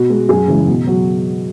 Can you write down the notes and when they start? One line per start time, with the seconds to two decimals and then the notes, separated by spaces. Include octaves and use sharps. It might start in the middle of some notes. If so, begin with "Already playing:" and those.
Already playing: B2 F#4
0.10 G#3
0.29 F#2 G#4
0.48 C#3 E3 G#3
0.67 B2
0.87 F#3